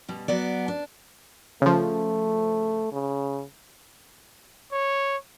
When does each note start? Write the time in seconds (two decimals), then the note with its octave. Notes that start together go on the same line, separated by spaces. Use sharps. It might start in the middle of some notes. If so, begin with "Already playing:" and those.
0.08 B2 G3
0.28 F#3 B3 D5
0.68 D4
1.62 C#3 F3 A3
2.92 C#3
4.73 C#5